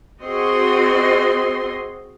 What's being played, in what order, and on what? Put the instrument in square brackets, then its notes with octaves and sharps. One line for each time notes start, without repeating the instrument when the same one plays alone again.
[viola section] C4 F#4 G#4 D#5 C6